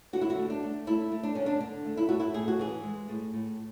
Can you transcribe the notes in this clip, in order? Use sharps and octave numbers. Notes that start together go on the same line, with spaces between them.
D3 F#4
E4
F#4
A3
D4
A3
A3 E4
A3
D4
D3 C#4
D4
D3 D4
A3
E4
A3 F#4
E4
A2 G#4
F#4
E3 G#4
G#3
A2
A2